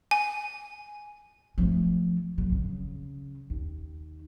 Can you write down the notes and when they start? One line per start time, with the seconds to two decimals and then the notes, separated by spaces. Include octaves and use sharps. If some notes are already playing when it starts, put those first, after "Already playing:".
0.11 G#5
1.58 F3 A3
2.38 A#1 F#3
2.52 C#3
3.50 D#2